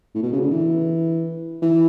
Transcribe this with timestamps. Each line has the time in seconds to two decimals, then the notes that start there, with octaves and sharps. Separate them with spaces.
0.14 A2
0.22 B2
0.32 C#3
0.41 D3
0.51 E3
1.62 E3